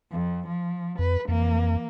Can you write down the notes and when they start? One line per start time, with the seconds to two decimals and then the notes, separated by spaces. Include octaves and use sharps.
0.11 F2
0.47 F3
0.99 F2 B4
1.28 F2 E3 A#3